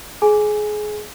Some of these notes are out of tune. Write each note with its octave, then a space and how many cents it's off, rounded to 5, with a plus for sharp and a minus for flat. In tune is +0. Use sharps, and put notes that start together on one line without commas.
G#4 +25 G#5 +0